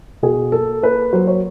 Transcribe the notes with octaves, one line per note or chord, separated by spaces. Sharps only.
B2 G#4
A#3 A4
A#3 B4
F#3 C5
C#5